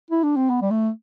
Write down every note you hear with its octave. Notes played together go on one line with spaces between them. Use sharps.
E4
D4
C4
B3
G3
A3